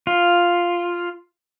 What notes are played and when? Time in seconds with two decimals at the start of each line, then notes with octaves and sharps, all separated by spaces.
0.07 F4